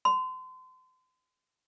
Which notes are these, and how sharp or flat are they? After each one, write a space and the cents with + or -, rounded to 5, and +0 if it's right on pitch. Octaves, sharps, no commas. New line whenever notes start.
C6 -35